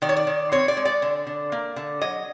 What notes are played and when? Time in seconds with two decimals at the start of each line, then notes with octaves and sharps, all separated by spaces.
0.02 D#3 D5
0.09 C#5
0.16 D5
0.27 D#3
0.52 C4 C#5
0.68 D5
0.77 G#3
0.85 D5
1.02 D3
1.27 D3
1.52 A#3
1.76 D3
2.01 F#3 D#5